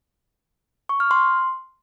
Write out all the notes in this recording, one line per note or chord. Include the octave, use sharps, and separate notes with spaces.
C#6
F6
C6